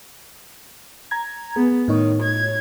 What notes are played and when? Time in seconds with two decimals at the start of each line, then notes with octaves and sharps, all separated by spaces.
1.11 A#5 G#6
1.56 B3 G#4
1.88 A2 D#3 D#4 C#5
2.22 G#6